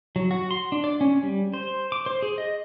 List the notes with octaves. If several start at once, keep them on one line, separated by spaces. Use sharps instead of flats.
F#3
F#4
C6
D4
D5
C#4
G3
C5
D6
C5
G#4
D#5